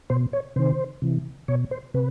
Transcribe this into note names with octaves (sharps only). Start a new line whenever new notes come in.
B2 C5
C#5
C3 D#3 C5
C3 E3
B2 C#5
C5
C3 B4